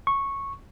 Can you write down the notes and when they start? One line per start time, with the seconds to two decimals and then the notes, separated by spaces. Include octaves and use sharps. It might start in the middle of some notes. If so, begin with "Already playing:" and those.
0.07 C#6